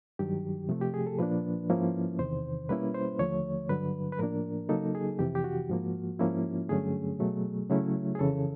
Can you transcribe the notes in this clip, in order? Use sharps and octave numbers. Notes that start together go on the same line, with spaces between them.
G2 D#3 F#3 G4
C3 F3 A3
G4
G#4
A4
A#2 F3 A#3 D4 B4
G#2 F3 A#3 C#4 E4
E2 C3 D#3 C5
B2 G3 A#3 C#4 E4 B4
C5
D#2 D3 F3 A3 C#5
G2 D3 F#3 B4
B4
A2 F3 A#3 D4 A#4
C#3 F#3 A#3 D#4 A4
G#4
F2 C3 E3 G4
G4
F#4
G#2 F3 A#3
G#2 F3 A#3 C#4 E4
G2 D3 F#3 A3 C#4 G#4
B2 F#3 A3
C#3 F#3 A3 C#4 E4
G#4
F2 C#3 E3 A4